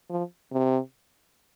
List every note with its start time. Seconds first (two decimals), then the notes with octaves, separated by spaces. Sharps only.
0.10 F3
0.52 C3